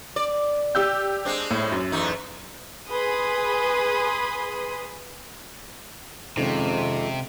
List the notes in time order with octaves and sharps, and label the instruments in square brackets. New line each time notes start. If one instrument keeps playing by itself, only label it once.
[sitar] D5
[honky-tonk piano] G4 E6 G6
[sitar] G#3 C4 D4
[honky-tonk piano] A2
F#2
[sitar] E2 A3 D#4
[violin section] G#4 B4 B5 C6 D#6
[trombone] F2 [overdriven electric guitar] C3 [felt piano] D#3 G#3 C#4